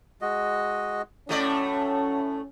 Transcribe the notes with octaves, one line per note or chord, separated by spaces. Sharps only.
G#3 F#4 D#5
A2 F#3 A3 C#4 D5